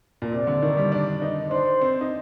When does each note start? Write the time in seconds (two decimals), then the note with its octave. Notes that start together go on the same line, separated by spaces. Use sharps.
0.22 A#2
0.32 C3 D5
0.47 D3
0.62 D#3
0.77 G3
0.92 D4
1.22 D#4
1.51 D4 C5
1.81 C4
2.01 D#4